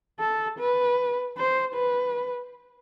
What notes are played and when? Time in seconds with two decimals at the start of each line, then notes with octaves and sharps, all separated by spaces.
0.20 A4
0.59 B4
1.37 C5
1.75 B4